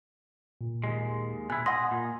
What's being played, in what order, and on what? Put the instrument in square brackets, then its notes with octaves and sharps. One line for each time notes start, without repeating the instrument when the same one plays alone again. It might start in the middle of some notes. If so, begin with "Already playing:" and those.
[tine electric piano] A#2
[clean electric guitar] D#2 G#3
[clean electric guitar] B2 E4 [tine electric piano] G#5 [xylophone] F#6
[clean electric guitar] D#5 [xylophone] F#5 C6
[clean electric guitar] A#2